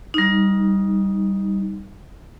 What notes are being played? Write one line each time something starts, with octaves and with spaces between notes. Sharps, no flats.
G3 D#4